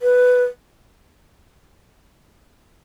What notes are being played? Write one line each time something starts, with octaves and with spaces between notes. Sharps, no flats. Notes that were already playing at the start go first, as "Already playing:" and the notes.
B4